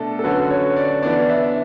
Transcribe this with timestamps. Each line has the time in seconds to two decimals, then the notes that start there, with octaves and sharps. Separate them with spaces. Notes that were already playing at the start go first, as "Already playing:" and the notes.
Already playing: B2 A3 D4 A4
0.19 A4
0.24 D3 F#3 C#4 F#4 B4
0.50 C#5
0.76 D5
1.02 E3 B3 D4 D5
1.30 E5